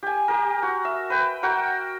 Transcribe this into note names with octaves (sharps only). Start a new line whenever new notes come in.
G4 G#5
G4 A#4
F#4
E5
B4 G5
F#4 A#4 F#5 G5